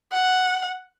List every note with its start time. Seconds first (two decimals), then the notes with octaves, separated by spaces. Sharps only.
0.12 F#5